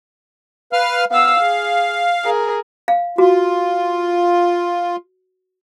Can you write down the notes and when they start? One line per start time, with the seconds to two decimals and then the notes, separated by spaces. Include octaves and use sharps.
0.73 B4 F5 F6
1.11 B3 F5 E6
1.41 G#4
2.25 G#4 A#4
2.88 F5
3.18 F4 F#4